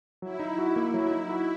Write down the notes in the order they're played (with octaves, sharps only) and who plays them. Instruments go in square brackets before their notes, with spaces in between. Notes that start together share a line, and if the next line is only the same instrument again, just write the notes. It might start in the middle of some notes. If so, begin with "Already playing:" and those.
[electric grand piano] F#3 [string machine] E4
[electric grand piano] D#4
F#4
A#3
[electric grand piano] F#3 [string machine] E4
[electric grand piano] D#4
F#4